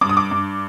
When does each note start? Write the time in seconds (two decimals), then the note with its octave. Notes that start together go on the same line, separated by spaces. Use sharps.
0.01 G2 D6
0.09 D#6
0.17 D6
0.31 G2